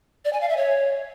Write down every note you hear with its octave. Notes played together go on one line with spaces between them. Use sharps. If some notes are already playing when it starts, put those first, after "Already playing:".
D5
G#5
F5
E5
C#5